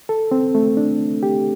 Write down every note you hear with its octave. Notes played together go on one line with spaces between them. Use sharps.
A4
C4
A3
D4
G4